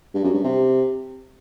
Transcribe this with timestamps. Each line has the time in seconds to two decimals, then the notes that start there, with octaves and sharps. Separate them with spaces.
0.14 G2
0.24 F#2
0.34 G2
0.44 C3